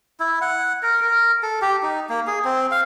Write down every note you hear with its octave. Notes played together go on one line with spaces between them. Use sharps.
E4
F#5
A#4
A#4
A4
G4
D#4
A#3
G#4
C4
F5